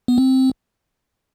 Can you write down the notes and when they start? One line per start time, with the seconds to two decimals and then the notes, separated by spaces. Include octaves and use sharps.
0.08 B3
0.18 C4